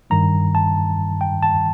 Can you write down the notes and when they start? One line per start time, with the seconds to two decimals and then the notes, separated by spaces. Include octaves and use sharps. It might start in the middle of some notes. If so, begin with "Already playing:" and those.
0.10 G2 D#3 G3 A#5
0.55 A5
1.21 G5
1.43 A5